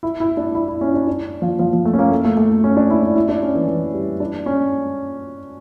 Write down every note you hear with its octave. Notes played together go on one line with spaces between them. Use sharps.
E4
E4
D4
E4
E4
C#4
D4
D4
F3
F3
F3
A3
C#4
A#3
A3
A3
A3
C#4
D4
E4
D4
E4
D4
C#4
E3
E3
G3
D4
C#4